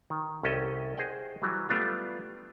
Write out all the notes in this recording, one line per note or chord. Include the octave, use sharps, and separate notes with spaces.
D#3
C2 C#4 G4 A4 D#5
G#4 C5 D#5 F#5 G5
E3 F#3 G3
G3 A3 B3 D4 F4